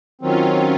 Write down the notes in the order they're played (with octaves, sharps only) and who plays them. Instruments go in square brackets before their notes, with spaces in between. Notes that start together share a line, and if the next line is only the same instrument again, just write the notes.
[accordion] D#3 F#3 C4 [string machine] C#4 F4